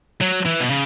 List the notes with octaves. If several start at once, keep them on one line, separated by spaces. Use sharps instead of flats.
F#3
E3
B2
C#3